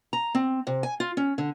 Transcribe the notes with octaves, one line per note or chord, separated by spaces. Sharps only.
A#5
C4
C3
G#5
F4
C#4
D3